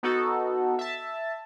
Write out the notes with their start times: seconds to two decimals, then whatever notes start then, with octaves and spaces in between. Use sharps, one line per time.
0.03 B3 D#4 F#4 A4
0.79 E5 A5